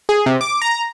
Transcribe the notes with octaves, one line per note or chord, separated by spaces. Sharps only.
G#4
C3
D6
A#5